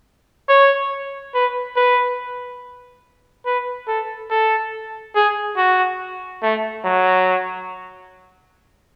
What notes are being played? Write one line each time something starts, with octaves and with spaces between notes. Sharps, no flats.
C#5
B4
B4
B4
A4
A4
G#4
F#4
A3
F#3